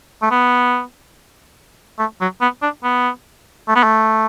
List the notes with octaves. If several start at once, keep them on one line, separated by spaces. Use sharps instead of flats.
A3
B3
A3
F#3
B3
D4
B3
A3
B3
A3